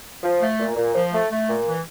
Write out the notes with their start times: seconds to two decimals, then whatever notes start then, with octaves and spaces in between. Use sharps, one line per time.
0.23 F3
0.41 A3
0.60 A#2
0.76 A#2
0.95 F3
1.13 A3
1.30 A3
1.49 A#2
1.67 E3